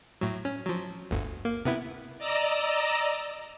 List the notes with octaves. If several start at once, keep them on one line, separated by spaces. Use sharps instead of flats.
A2 F#3
C#4
F3 F#3
G1 D2
A#3
C3 B3 E4
D5 D#5 A#5 E6